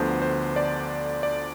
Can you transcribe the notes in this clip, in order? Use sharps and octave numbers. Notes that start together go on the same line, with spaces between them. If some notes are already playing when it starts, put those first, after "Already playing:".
Already playing: D2 D3 F3 B3 C5
C5
D5
D5